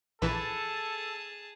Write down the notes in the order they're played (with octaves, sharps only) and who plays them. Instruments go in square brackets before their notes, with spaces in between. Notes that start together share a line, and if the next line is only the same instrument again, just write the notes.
[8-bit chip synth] A#1 E3 [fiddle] G#4 A5 [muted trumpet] A4 [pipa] B4